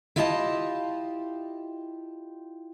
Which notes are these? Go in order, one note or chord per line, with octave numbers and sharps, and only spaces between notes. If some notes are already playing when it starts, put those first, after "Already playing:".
E4 F4 G4 D#5 G#5 A5